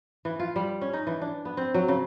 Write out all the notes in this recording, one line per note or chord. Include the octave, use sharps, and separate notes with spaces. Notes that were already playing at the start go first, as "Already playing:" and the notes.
E3
F4
G3
C#4
D#4
E3
D4
B3
C4
F#3
C#3